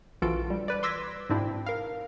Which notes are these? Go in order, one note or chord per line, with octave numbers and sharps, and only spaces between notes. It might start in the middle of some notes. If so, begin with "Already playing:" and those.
A#1 E3 F4 F#4 A4 D7
G3
B4 D5
C6 D6 E6 G#6 A#6 B6
G#2 B2 C4 D4 E4
A#4 F5